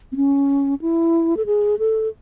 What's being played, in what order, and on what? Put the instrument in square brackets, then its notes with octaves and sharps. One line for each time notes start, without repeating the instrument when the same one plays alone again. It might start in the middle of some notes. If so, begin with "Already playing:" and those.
[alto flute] C4
C#4
E4
A4
G#4
A4